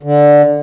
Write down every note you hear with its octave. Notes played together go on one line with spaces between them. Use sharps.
D3